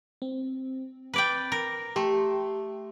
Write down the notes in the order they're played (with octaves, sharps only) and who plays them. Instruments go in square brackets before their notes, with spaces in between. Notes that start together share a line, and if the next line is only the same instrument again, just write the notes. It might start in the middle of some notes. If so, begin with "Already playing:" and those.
[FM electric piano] C4
[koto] B4 D5 G5
A#4
[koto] A3 [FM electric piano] G4 C6